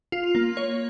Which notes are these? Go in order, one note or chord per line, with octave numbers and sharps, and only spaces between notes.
F4
A#3
C#5